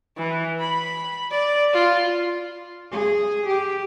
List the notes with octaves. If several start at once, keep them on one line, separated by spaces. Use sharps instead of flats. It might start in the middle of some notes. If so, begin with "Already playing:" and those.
E3
B5
D5
F4
G#4
G4